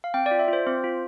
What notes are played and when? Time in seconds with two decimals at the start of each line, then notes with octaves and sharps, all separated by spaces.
0.04 F5
0.14 C4 G5
0.26 D5
0.31 F4
0.39 E5
0.48 F4 C5
0.67 C4 C5
0.84 F4